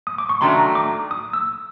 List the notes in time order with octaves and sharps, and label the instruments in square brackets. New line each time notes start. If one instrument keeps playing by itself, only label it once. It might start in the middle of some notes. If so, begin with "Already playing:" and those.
[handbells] D#6
D6
C#6
[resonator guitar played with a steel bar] D#3 F#3 A3 D4 [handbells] C6
[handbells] D6
D#6
E6